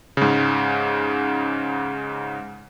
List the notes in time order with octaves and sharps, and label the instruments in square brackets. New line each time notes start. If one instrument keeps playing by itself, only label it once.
[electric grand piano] G#2 C#3